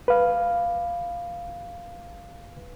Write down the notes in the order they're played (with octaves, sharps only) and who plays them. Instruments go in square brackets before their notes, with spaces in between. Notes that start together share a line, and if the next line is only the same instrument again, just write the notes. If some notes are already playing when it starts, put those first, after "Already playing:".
[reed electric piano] B4 F5